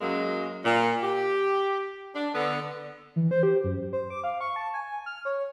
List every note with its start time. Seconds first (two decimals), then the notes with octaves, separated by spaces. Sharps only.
0.01 F#2 F#3 G#3 A#3
0.65 A#2
1.03 G4
2.15 D4
2.34 D3 B3
3.16 E3
3.31 C5
3.43 G4
3.64 F#2
3.93 C5
4.10 D6
4.24 F5
4.41 C#6
4.56 A5
4.74 G#5
5.06 F6
5.25 C#5